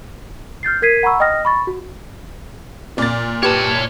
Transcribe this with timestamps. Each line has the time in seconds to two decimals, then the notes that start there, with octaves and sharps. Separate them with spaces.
0.63 F6 G6 A6 C7
0.82 A#4 G#6 B6 C7 D#7
1.03 F#5 A#5 B5 C#6 E6
1.20 D#5 G5 D#6 F6 A#6
1.45 B5 C#6 A6
1.67 F#4
2.98 A#2 D5 A6
3.43 G4 B4 C#5 A5